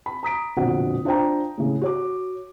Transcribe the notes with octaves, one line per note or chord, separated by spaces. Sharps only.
B5
A#5 D#6 B6 D7
F1 A#1 B2 D3 F#5
D4 F4 C5 G5 A#5
A2 C#3
F#4 C#5 D6